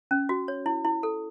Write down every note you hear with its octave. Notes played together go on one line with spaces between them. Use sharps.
C#4
F#4
C#5
E4
E4
A4